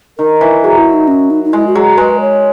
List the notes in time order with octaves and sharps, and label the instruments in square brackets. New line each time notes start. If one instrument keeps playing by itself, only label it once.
[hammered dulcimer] D#3 [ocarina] A#4
[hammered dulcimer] E3
[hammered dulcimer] F#3 [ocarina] G#4
[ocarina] E4
D#4
C#4
D#4
D#4
[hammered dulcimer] G#3 [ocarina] E4
[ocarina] F#4
[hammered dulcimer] F#3 [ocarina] G#4
[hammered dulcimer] G#3 [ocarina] B4
[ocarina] C#5